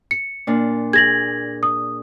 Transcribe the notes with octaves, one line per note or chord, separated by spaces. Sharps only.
C#7
A#2 D4
G#4 G#6 A#6 F#7
D#6